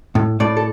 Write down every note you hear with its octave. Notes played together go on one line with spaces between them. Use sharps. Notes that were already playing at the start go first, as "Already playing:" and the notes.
A2
A2 D5
A4